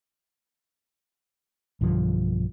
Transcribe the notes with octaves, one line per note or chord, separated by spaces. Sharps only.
B1 G2 D3 F3